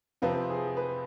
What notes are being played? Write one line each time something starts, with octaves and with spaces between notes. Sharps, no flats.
F2 C3 F3 C4 B4
G#4
B4